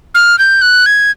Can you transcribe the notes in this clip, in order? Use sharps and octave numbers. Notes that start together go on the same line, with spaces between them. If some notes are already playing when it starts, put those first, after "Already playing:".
F6
G6
F#6
G#6